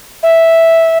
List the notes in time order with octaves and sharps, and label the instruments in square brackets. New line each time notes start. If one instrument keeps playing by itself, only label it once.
[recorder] E5